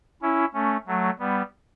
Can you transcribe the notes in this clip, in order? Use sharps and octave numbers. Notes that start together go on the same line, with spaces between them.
C#4 E4
A3 C#4
F#3 A3
G3 B3